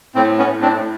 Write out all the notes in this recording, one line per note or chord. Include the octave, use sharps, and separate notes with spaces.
A2 C4
B3 C#4
A2
C4 D4
A2